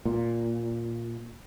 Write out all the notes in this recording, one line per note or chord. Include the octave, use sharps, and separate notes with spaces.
A#2